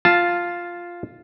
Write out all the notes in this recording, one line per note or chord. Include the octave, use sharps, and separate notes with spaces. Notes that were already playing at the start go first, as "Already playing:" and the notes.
F4 A5